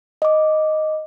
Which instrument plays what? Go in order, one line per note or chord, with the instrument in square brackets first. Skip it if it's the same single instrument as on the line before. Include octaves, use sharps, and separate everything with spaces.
[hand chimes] D#5 D6